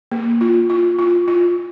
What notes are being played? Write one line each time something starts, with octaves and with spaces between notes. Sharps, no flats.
A#3
F4
F4
F4
F4